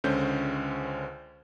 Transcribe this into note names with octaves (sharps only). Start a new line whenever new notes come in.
C#2 D3 C#4 C5 G6